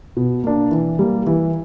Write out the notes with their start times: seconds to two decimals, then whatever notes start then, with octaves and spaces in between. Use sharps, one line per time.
0.17 B2
0.44 A#3 D4
0.71 E3
0.99 G3 A#3
1.27 E3